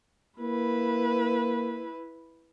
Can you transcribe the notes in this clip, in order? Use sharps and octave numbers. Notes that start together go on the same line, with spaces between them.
A#3 E4 B4